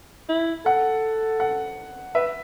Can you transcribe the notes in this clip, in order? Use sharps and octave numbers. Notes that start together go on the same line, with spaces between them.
E4
A4 F#5
F#5
B4 E5